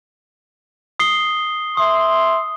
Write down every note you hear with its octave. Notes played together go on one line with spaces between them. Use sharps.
D#6 C7 G7
E5 C6 D#6